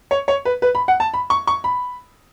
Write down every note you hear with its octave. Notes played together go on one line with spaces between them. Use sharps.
C#5
C#5
B4
B4
B5
F#5
A5
B5
C#6
C#6
B5